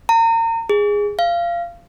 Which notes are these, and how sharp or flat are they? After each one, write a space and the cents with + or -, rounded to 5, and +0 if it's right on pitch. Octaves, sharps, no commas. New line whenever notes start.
A#5 -35
G#4 -10
F5 -20